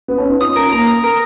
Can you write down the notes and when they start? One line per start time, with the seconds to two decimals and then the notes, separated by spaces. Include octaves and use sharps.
0.08 B3
0.18 C#4
0.29 D#4
0.41 F4 D#6
0.56 C#4 A#4
0.72 A#3 A#5
0.87 D#6
1.04 A#4